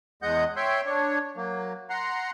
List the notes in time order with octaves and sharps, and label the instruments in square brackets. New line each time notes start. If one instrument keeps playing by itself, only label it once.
[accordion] E2 G#3 D#5 F#5 G6
C#5 E5 G5 C6
D4 C#5
F#3 A#3
F#5 A#5 C6